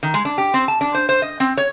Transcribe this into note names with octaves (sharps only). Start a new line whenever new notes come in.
D#3
G#3
D4
G4
C4
A5
D4
C5
C5
D#5
C4
C#5